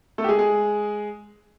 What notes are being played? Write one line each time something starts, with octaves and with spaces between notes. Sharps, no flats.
A3 A4
G4
G#3 G#4
G#3 G#4